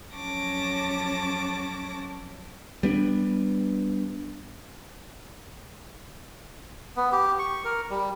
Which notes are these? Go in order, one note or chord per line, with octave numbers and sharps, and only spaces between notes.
F2 F#3 C#4 A5 D6 A#6
G3 B3 D4
B3
G4
C#6
A#4
G3